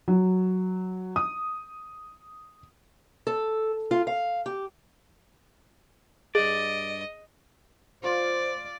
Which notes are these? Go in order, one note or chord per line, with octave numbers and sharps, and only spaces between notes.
F#3
D#6
A4
F4
F5
G4
G2 G#4 D5 D#5
F4 C5 D5 F5